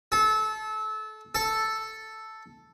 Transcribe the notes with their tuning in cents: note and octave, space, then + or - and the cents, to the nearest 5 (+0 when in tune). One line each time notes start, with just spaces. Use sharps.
A4 -25
A4 +0